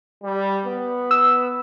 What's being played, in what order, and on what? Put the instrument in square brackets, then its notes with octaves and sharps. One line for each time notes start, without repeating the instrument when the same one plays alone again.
[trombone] G3
B3
[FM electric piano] E6